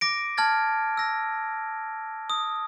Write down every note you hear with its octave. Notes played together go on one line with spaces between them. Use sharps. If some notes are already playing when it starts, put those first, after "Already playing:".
D6 A#6 D7
A5 F6 G#6 A6
E6 A#6
D#6